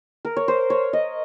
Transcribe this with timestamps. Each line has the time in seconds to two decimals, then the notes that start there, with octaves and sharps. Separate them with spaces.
0.25 A#4
0.37 C#5
0.48 C5
0.70 C#5
0.93 D#5